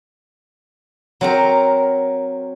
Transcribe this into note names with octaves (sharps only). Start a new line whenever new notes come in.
F#3 C4 A#4